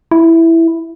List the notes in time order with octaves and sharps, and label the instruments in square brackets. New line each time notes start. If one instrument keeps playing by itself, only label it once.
[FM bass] E4